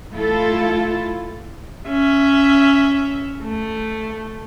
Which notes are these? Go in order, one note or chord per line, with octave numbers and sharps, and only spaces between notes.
A3 E4 F4 A4
C#4 E5
A3